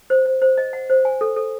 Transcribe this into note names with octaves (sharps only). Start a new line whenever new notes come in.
C5
C5
C5
D#5
F#5
C5
G#5
A4
A4